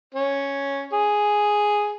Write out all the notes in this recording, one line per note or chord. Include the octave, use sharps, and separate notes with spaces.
C#4
G#4